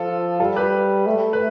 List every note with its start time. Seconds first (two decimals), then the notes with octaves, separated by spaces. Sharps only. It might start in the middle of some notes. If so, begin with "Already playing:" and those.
Already playing: F3 F4 A4
0.40 G3 F4 A4
0.56 G4 B4
1.07 A3
1.33 B4